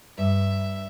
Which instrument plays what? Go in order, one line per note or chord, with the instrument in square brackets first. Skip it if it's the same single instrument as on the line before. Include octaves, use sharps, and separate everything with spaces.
[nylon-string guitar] G2 [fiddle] E5